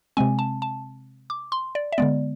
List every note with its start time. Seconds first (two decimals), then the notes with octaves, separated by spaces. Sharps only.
0.17 C3 G#3 C4 G#5
0.39 A5
0.62 A5
1.30 D6
1.52 C6
1.75 D5
1.92 E5
1.98 D3 G#3 B3 D5